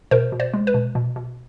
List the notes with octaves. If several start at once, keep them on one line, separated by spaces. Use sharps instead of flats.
B2 A#4 C5
B2
C5 D5
G#3
B4
B2
B2
B2